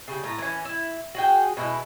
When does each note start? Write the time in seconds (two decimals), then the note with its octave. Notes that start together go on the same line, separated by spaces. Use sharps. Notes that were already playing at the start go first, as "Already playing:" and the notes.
0.08 C#3 G3
0.24 A2 A#5
0.38 E3 C#4
0.65 E4
1.15 F#4 G#4 G5
1.57 B2 G#3 E4